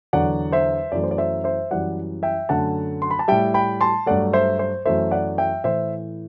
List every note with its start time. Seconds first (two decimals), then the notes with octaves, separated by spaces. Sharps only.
0.13 E2 D3 F#3 D5 F#5
0.52 C5 E5
0.92 F#2 E3 A3 D5
1.03 C5
1.11 D5
1.18 C5 E5
1.44 C5 E5
1.71 F#2 E3 G3 D5 F#5
2.23 E5 G5
2.49 F#2 D3 A3 F#5 A5
3.02 C6
3.11 B5
3.19 A5
3.28 A2 G3 E5 G5
3.54 G5 B5
3.81 A5 C6
4.06 G2 F#3 A3 D5 F#5
4.33 C5 E5
4.59 C5
4.85 F#2 E3 A3 C5 E5
5.11 D5 F#5
5.38 E5 G5
5.64 A2 E3 A3 C5 E5